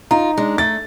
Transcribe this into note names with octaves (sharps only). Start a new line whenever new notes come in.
D#4 F4 A#5
G#3 D4
A3 A6